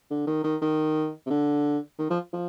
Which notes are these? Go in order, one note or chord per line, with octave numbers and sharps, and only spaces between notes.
D3
D#3
D#3
D#3
C3
D3
D#3
F3
F3